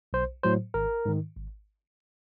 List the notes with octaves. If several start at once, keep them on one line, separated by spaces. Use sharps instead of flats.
B1 C5
A2 F#3 C5
G#1 A#4
G#2 D#3
G#1